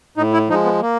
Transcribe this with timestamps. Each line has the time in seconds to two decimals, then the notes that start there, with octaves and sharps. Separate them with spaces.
0.17 A2 D#4
0.33 E4
0.49 F3 G#3 D#4
0.65 B3
0.81 A#3